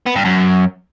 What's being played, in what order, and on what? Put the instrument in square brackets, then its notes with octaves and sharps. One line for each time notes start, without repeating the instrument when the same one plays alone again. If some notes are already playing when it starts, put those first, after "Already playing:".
[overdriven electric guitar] B3
G2
F#2